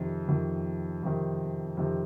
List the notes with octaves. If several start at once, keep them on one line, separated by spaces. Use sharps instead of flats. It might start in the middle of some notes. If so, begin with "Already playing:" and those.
Already playing: F2 C3 D#3
F2 C3 D#3
F2 C3 D#3
F2 C3 D#3